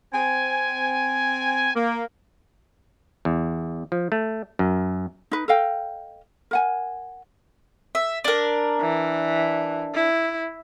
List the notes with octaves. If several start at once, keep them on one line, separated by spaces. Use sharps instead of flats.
C4 G#5
A#3
E2
F3
A3
F#2
D#4 B4
A4 D#5 F5 G5
A#4 F#5 G#5
E5
D4 A#4
E3
E4